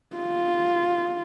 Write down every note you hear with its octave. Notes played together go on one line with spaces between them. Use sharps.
F4